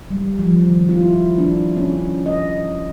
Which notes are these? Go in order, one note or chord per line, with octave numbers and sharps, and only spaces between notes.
G3
F3
D#3
F4
E4
D4
C#4
D#5